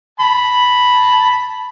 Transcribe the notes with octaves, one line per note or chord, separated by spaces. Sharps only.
A5 B5